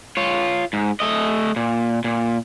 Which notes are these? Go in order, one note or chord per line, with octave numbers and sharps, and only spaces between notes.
F4 C#5
G#2
A3 D#5
A#2
A#2